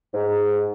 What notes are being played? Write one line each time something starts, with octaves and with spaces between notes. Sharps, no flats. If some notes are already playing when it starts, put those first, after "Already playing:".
G#2